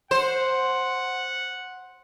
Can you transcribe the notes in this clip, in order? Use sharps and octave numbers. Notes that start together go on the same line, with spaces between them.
C5 F#5